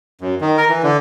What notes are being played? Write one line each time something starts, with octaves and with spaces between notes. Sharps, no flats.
F#2
D#3
A#4
E3
D3